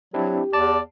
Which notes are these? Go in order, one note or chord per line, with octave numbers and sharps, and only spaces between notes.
F#3 C4 D4 E4 G4
E2 D5 A5